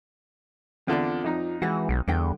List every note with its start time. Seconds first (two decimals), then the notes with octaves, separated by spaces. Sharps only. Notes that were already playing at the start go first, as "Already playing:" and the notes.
0.88 E2 D3 C4 F4 D5
1.24 F2 D#4 A#5
1.62 E3 G#3 F#4
1.89 B1
2.08 E2 G2 D3 G5